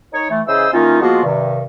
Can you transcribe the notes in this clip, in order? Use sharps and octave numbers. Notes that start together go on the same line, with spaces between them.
D#4 C#5
E3 A3
C#3 E3 G#4 C5 D#5 E6
D#3 E3 A#3 C#4 D#4 F4
F3 G#3 A#3 B3 F4 F#4
G2 C3 D#3